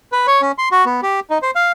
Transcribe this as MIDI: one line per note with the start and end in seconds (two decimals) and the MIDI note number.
0.12 0.27 71
0.27 0.41 73
0.42 0.52 61
0.58 0.69 84
0.72 0.85 66
0.86 1.01 59
1.03 1.20 67
1.30 1.38 63
1.42 1.51 72
1.55 1.72 77